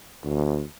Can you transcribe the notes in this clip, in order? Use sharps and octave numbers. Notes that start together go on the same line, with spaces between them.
D2